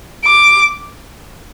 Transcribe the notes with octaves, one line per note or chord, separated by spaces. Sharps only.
D6